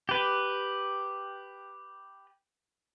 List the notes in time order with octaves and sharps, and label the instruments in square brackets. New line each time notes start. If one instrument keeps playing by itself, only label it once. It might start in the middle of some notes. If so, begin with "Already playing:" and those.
[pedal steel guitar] G4 B4